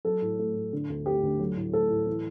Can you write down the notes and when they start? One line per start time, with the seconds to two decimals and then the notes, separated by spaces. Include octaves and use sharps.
0.05 F#3 A4
0.22 A2
0.39 A3
0.56 A2
0.73 D3
0.89 D2
1.06 A3 G4
1.23 D2
1.40 F#3
1.56 A2
1.73 A3 A4
1.90 A2
2.07 E3